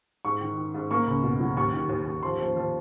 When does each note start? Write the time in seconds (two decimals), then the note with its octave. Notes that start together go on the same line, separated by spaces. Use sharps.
0.25 G#2 C#6
0.41 D#3
0.57 D#3
0.74 G#2
0.91 A#3 C#6
1.07 C#2
1.23 B2
1.40 F#3
1.57 D#2 C#6
1.73 D#3
1.89 D#2
2.06 D#2
2.23 F3 C6
2.40 F3
2.56 F3